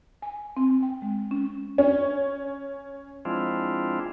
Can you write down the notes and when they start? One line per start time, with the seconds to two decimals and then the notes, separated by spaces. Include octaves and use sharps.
0.22 G#5
0.57 C4
0.82 G5
1.02 G#3
1.31 C#4
1.78 C#4
3.25 F3 G#3 C4 D4 E4 F4